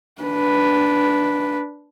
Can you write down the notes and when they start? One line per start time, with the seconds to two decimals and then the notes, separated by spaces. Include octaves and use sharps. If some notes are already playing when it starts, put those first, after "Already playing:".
0.22 D4 B4